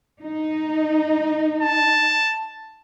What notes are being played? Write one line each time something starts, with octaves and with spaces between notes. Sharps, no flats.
D#4
A5